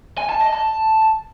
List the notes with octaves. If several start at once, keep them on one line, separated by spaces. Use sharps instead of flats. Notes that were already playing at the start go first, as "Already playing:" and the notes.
G#5
A5
D#5
A5